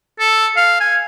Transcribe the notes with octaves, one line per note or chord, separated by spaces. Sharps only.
A4
F5
G#5